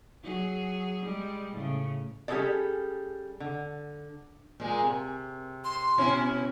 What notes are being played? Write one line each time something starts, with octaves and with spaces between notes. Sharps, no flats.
F#3 G#4
G3 G#3
A2 C#3
G3 C#4 D#4 G#4 A4 D5
D3
A#2 G#3
C3
C6
B2 C#4 E4